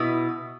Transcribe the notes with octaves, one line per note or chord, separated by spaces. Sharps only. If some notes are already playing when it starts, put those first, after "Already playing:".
Already playing: B2 B3 E4